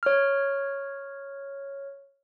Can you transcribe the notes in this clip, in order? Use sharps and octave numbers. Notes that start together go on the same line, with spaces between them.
C#5 F6